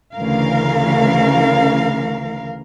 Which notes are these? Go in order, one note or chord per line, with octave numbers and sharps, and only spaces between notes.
D2 C#3 E3 A#4 F5